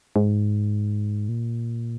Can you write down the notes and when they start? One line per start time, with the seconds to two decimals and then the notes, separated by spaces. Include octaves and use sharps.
0.16 G#2
1.29 A#2